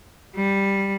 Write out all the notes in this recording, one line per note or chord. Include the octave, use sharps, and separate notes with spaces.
G3